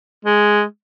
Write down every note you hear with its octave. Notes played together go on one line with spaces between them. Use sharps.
G#3